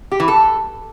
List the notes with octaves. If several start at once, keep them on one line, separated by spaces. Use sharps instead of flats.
G4
E3
A4